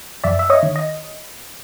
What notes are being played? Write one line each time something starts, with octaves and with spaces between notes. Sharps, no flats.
F#2 D5 E5
E5
C#5 D#5
D#3
D#5